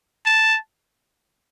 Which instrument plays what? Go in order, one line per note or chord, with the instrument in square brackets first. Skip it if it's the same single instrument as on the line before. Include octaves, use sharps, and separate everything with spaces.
[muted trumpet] A5